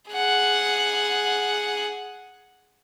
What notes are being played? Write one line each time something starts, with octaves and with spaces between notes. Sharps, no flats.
G#4 F#5